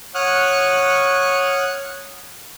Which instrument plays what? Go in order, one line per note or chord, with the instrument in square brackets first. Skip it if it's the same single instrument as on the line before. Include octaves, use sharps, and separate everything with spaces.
[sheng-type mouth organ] C#5 F#5 C#6 D#6 F6 F#6